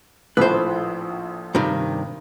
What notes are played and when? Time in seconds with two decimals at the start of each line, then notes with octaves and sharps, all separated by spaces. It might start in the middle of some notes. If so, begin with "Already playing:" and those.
0.37 A#1 A2 F3 B4 C5
1.55 G2 C3 D#3